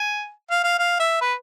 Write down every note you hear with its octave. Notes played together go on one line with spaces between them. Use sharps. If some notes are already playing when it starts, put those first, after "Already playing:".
Already playing: G#5
F5
F5
F5
E5
B4